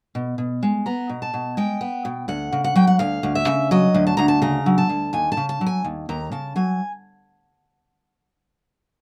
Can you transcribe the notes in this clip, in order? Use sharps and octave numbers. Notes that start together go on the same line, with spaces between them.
B2
B2
G#3
B3 A#5
B2
A5
B2
G#3 G5
B3
B2
D2 F#5
C#3
F#5
F#3 G5
F#5
D2 F5
D2
E5
C#3
F#3 D#5
D2
A5
D2 A#5
A5
C#3 A#5
F#3
A5
D2
D#2 G#5
A5
C#3
A5
F#3
G#5
D#2
D#2 A#5
C#3 A5
F#3 G#5